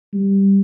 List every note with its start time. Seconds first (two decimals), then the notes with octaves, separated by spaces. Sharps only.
0.13 G3